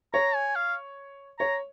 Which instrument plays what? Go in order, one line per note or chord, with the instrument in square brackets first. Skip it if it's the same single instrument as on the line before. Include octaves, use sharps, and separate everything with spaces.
[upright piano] C#5 [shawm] A#5
[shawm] G#5
F5
[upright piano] C#5 [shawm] A#5